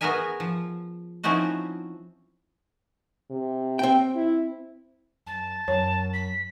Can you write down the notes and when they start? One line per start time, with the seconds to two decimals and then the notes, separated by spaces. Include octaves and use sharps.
0.01 B3 F#4 G#4 A#4 E5 G#5
0.40 F3
1.23 F3 C4 C#4 D#4 E4 F#4
3.30 C3
3.79 C4 G5
4.15 E4
5.26 F#2 A5
5.68 F#2 C#5
6.13 B6